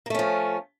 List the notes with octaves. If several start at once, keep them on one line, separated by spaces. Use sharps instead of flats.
F3 A3 A#3 C#4